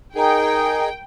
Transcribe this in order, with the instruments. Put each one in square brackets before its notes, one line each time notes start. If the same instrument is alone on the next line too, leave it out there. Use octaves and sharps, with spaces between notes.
[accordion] D#4 G#4 [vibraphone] A#4 A#5 [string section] G5